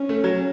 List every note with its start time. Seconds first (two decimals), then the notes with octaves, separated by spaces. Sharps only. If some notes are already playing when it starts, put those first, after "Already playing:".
Already playing: C#4
0.09 A3
0.24 F#3